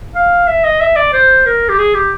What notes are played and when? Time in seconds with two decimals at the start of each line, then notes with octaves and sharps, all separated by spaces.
0.15 F5
0.47 E5
0.64 D#5
0.81 E5
0.96 D5
1.13 C5
1.46 A#4
1.69 G4
1.78 G#4
1.95 G4